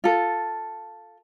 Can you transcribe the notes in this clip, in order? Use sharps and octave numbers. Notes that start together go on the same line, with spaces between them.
F4 A4